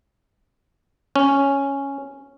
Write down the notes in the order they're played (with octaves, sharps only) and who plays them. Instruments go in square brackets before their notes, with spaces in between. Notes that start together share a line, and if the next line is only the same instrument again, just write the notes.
[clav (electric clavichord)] C#4